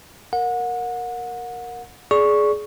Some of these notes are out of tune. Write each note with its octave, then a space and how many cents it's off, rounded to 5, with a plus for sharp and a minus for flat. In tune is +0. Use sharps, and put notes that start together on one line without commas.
A#4 +0 F#5 -30
G#4 +20 D5 -15 C#6 +0